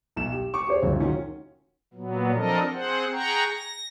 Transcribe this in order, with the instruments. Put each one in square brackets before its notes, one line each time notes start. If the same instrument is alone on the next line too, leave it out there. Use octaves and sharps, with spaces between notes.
[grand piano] B1 E7
G4
C#6 D6
G4 G#4 C5 C#5
D1 C#2 F#2
D#3 C#4 F4 F#4
[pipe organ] A#2 F#3 B3
F3 C4 D4 A4 A#4 D#5
C4 G#4 C5 F#5
G#4 F#5 G5 A#5 C#6
A#6